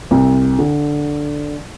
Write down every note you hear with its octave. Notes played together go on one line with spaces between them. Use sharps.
C2
D3